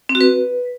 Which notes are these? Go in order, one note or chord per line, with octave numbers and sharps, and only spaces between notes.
C4
F#4
B4